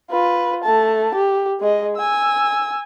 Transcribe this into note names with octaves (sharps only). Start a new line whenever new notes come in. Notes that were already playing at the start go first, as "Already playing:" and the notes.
F4 B4
A3 A5
G4
G#3 D#5
G#5 E6